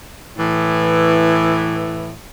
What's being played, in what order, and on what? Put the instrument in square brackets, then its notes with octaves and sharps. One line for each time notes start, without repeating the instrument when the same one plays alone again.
[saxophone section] A2 E3